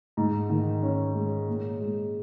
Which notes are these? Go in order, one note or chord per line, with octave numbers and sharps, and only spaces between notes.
G#2
D#3
C#4
G#3
A#2
G#3